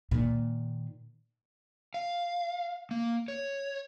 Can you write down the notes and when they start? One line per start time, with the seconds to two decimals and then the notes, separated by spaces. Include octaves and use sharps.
0.11 A#2 D#3
1.94 F5
2.91 A#3
3.28 C#5